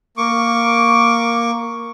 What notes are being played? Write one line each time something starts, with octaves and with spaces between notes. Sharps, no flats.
A#3 C#6 D6